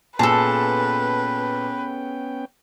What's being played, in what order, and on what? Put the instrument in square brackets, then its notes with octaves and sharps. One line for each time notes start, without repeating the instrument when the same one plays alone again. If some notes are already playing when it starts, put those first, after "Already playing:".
[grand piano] A#2 A5 [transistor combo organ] B3 C#4 G5 [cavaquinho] G#4 A4 [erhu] B4